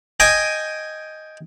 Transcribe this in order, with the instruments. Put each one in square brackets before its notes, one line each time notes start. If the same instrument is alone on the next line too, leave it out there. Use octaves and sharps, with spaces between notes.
[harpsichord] D#5 G5 G#5 D#6